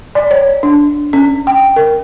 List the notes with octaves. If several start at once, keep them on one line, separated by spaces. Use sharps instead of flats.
D5
C#5
D4
C#4
G5
A#4